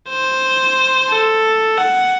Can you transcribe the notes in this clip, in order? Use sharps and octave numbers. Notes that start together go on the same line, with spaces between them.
C5
A4
F#5